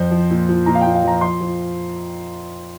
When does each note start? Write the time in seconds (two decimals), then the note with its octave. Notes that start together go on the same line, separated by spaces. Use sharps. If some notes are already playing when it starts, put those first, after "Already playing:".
Already playing: F2 C5
0.11 F3
0.30 A#2
0.49 F3
0.66 A#2 A#5
0.75 F5
0.81 A#2 G5
0.95 F5
1.04 F3 A#5
1.21 F3 C6
1.41 F3